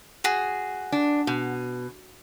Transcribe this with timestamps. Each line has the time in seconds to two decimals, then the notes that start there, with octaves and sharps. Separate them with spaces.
0.24 F#4 G#4
0.92 D4
1.27 B2